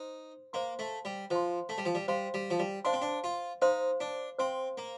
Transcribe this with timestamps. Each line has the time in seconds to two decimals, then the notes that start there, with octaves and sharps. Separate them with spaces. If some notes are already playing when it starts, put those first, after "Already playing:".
Already playing: D#4 C5 C6
0.53 A#3 C5 F5 C6
0.79 A3
1.05 G3
1.31 F3 C5 F5 C6
1.69 A3
1.78 G3
1.86 F3
1.95 G3
2.08 G3 C5 F5 C6
2.34 G3
2.51 F3
2.59 G3
2.85 D4 C5 F5 C6
2.93 C4
3.02 D4
3.24 F4
3.62 D#4 C5 F5 C6
4.00 D4
4.39 C4 C5 F5 C6
4.78 A#3